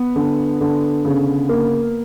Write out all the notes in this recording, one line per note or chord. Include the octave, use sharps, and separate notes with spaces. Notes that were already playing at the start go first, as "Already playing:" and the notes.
Already playing: B3
D3
D3
C#3
A#3